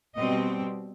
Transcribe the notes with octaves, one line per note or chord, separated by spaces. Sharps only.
B2 G3 C4 D#5